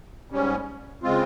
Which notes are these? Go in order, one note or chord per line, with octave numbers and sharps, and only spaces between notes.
G#2 G3 C#4
C#3 G#3 C4 F4